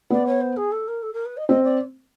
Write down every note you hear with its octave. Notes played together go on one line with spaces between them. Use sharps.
B3 D5
C#5
C5
G#4
A4
A#4
A4
A#4
B4
D#5
C4 D#5
D5